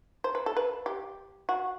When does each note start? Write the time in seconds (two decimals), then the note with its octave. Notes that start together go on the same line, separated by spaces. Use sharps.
0.24 C5
0.35 B4
0.46 A4
0.57 B4
0.86 G4
1.49 F#4